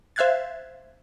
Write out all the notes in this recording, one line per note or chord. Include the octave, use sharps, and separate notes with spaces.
C5 E5 F5 F#6 G#6 A6